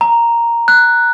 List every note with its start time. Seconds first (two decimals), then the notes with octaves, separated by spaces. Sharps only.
0.01 A#5
0.68 F#6